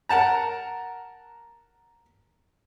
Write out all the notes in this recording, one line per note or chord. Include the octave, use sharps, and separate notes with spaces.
A#4 F#5 A5 A#5